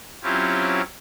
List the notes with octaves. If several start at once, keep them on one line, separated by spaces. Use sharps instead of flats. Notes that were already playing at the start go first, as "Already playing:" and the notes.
F#3 C4 C#4 E4 F4 G4